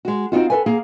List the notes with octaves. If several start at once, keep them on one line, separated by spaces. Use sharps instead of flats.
G#3 F#4
C4 D#4 F4 F#4
A4 B4 G#5
A#3 G#4 F5